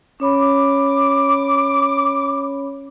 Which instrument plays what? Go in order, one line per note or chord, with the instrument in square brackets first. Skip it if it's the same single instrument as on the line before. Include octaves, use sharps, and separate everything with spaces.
[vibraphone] C#4 C#5 B5 [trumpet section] D6